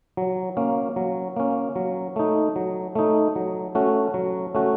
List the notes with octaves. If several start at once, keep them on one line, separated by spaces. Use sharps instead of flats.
F#3
A#3 C#4
F#3
A#3 C#4
F#3
A3 D#4
F#3
A3 D#4
F#3
A3 C#4 F#4
F#3
A3 C#4 F#4